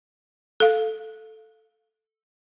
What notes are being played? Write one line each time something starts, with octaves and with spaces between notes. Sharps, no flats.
A4 F5